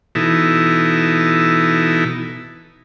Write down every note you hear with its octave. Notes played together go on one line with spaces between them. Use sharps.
B2 E3 D#4 E4 A4